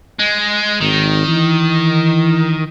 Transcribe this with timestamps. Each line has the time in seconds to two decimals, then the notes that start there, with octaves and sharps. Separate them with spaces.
0.20 G#3
0.80 G#1 D#3
1.28 E3